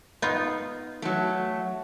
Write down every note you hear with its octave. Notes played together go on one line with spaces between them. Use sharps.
B3 D#4 F4
F#3 A3